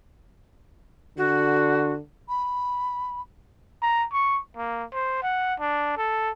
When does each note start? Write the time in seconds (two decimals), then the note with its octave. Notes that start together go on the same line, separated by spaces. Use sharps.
1.17 D3 F#4
2.29 B5
3.82 A#5
4.12 C#6
4.57 A#3
4.93 C5
5.22 F#5
5.60 D4
5.97 A4